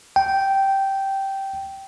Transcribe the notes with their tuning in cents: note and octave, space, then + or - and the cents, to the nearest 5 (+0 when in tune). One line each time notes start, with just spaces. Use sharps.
G5 -10